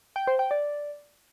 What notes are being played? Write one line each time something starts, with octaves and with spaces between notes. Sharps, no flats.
G5
C5
G5
D5